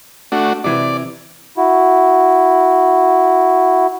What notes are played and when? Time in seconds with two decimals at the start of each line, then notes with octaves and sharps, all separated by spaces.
0.32 A3 D4 F#4
0.64 C3 E3 D5
1.57 E4 F#4